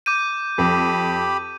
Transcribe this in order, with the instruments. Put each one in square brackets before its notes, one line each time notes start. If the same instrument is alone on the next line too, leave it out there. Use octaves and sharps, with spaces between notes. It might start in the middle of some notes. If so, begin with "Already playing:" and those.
[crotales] D6 G6 D#7
[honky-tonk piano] F2 [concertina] G4 B5